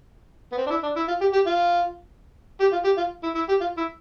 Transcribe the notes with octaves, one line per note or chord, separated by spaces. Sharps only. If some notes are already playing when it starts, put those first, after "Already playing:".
B3
C4
D4
E4
D4
E4
F4
G4
G4
F4
G4
F4
G4
F4
E4
E4
G4
F4
E4